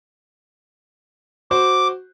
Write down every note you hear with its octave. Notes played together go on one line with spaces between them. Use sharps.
F#4 C5 D6